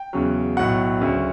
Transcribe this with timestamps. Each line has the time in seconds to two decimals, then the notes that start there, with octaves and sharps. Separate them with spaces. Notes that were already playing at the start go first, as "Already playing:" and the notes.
Already playing: G5
0.13 E2 C#3 F#3
0.57 B1 A2 F#3 F#5
1.01 D2 C#3 F#3